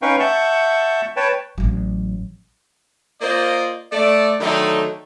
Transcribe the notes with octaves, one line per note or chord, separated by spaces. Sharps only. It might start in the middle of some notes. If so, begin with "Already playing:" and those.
C#4 D#4 B4 F5 G5 C#6
E5 F#5 A5 C#6 G6
B4 C#5 G5 A5
A1 F#3
A#3 F4 A#4 C5 D5 D#5
A3 D5
D3 D#3 F#3 A3 D4 D#4